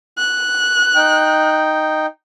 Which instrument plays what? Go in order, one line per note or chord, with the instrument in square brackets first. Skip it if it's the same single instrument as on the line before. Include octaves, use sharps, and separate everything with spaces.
[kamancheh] F#6
[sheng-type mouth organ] D#4 G5